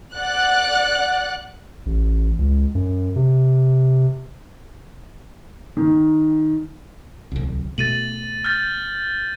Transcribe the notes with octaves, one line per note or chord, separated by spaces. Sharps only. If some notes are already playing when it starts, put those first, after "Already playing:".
D5 F#5 F#6
A1
C#2
F#2
C3
D#3
D1 C2
B2 A3 A6 D#7 F#7
F6 G6 A6